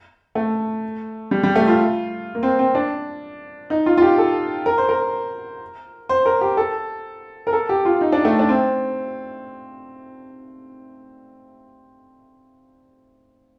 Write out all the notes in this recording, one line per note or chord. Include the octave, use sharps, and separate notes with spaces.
A3
G3
G3
A3
F4
A#3
C4
C4
D4
D#4
F4
F4
G4
A4
A#4
C5
A#4
C5
A#4
G4
A4
A#4
A4
G4
F4
D#4
D4
A3
D4
C4